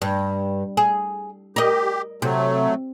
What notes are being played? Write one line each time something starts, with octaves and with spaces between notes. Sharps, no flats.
G2
G#4
G4 A#4 D#5
C3 F#3 A3